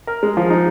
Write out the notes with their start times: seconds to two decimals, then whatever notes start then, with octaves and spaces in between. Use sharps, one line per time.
0.07 A#4
0.23 G#3
0.37 F3
0.50 D#4